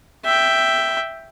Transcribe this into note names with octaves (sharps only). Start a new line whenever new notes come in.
E5 G5